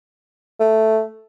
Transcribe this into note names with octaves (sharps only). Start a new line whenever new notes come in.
A3